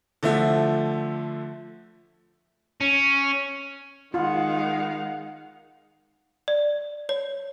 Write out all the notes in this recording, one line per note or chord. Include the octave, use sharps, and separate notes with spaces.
D3 F3 A3 E5
C#4
D#3 G#3 F4 F5 F#5
D5
C#5